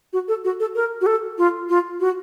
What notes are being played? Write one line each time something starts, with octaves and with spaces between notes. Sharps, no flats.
F#4
A4
F#4
A4
A#4
F#4
A4
F4
F4
F#4